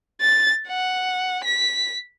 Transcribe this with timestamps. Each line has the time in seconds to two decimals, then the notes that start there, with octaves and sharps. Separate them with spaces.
0.21 A6
0.67 F#5
1.44 B6